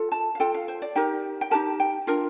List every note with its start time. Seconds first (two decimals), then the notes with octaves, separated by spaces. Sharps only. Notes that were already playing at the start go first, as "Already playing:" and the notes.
Already playing: F4 A4
0.12 A5
0.35 F5
0.40 F4 A4 G5
0.54 F5
0.68 C5
0.82 D5
0.95 D#4 G4 A#4 G5
1.41 G5
1.51 D#4 G4 A#4 A5
1.80 G5
2.07 D4 F4 A#4